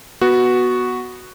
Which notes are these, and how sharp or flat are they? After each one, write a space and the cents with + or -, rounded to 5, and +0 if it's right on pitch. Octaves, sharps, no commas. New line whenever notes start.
B3 -5 F#4 +0